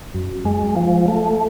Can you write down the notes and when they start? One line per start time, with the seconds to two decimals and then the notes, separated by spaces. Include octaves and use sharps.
0.14 F#2
0.45 G#3
0.76 F3
1.08 A3